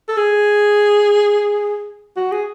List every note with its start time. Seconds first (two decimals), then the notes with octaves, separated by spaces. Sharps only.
0.09 A4
0.17 G#4
2.16 F#4
2.32 G#4